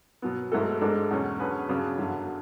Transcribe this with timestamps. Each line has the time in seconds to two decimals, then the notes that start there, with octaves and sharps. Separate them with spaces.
0.22 B2 F#3 B3
0.52 G#2 F#3 A3 E4 A4
0.81 G#2 G#3 D4 A4
1.11 E2 B2 F#3 C#4
1.40 D3 F#3 C#4 G#4 B4
1.69 C#3 F#3 B3 D4
1.98 F#2 D3 F#3